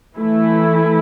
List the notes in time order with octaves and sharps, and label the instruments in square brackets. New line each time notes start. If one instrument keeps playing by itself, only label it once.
[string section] E3 A3 E4